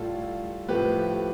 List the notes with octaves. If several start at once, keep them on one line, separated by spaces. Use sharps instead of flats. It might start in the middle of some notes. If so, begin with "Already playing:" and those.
Already playing: A2 G3 F4 A4
A2 F3 A3 G4 B4